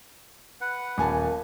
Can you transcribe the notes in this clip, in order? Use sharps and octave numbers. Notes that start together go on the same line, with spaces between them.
B4 F#5
D#1 A#3 G#5 A5